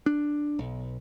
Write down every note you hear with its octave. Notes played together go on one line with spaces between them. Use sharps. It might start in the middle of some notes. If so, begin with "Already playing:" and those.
D4
B1